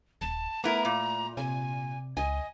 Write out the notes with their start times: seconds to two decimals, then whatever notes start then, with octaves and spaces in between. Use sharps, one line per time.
0.21 D#1 A5
0.64 A3 B3 E4 A#4 A#5
0.85 A#2
1.37 C3 G#5
2.17 C#2 D#5 G#5